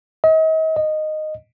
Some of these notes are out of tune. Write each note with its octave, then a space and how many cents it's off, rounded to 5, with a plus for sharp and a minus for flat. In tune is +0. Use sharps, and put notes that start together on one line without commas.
D#5 +40
D#5 -10